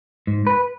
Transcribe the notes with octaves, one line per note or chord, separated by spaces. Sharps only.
G#2
B4